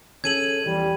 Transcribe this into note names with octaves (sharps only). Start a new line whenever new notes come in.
C#4 G#4 A4 G#6 D#7 F#7
E2 E3 F3 G3